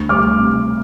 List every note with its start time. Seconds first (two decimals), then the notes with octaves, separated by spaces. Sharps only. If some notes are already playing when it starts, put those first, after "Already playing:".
Already playing: D2
0.09 G3 D6 F6
0.39 C3